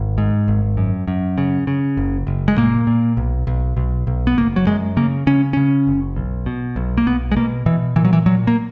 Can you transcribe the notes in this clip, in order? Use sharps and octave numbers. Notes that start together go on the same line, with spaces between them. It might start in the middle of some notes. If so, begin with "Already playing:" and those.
Already playing: G#1
G#2
G#1
F#2
F#2
C#3
C#3
F#1
F#1
G#3
A#2 A#3
A#2
B1
B1
B1
B1
B3
F#1 A#3
F#3
F#2 G#3
C#3 A#3
C#3 C#4
C#3 C#4
F#1
B1
B2
B1
A#3
B1 B3
G#3
B2 A#3
B2 E3
A#2 E3
F#3
E3
A#2 F#3
A#3